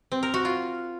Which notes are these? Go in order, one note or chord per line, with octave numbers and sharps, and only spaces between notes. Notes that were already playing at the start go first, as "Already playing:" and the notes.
C4
A#4
F#4
F4